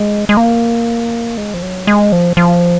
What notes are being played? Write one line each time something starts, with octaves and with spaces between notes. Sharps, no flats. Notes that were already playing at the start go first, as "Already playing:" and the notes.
Already playing: G#3
G#3
A#3
G#3
F3
F#3
G#3
F3
F3